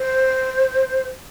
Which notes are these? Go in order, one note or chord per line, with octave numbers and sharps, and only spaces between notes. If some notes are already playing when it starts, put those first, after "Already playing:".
Already playing: C5